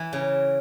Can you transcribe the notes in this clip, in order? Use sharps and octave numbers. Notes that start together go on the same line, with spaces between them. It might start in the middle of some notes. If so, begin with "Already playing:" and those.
Already playing: E3
C#3